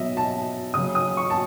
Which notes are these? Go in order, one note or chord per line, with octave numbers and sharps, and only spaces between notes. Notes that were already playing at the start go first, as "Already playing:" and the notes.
Already playing: B2 F#3 D#5 E5
A5
C#3 F#3 D#6
D#6
C#6
A5